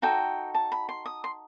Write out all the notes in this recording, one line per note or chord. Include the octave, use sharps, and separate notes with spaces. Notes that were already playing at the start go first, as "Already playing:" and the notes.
D#4 F#4 A4 G5
A5
B5
C6
D#6
C6